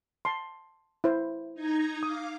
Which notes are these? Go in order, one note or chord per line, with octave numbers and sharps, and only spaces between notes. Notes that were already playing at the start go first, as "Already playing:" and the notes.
A5 C6
E4 C5
D#4 A#5 G#6
F5 D6 D#6